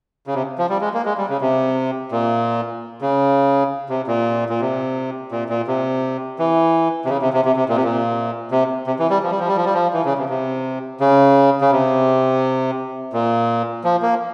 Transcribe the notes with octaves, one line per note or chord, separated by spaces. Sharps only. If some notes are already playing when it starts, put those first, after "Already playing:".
C#3
C3
F3
G3
G#3
A#3
G#3
G3
C#3
C3
A#2
C#3
C3
A#2
A#2
C3
A#2
A#2
C3
E3
C3
C#3
C3
C3
C3
C3
A#2
C3
A#2
C3
C3
E3
G3
F3
G3
F3
G3
F3
G3
F3
E3
C#3
C3
C3
C#3
C#3
C3
A#2
F3
A#3